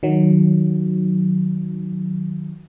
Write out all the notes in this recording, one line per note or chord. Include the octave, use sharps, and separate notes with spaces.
D#3 F#3